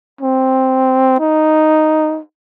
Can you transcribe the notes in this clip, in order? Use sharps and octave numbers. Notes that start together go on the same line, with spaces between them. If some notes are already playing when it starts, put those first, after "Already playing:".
C4
D#4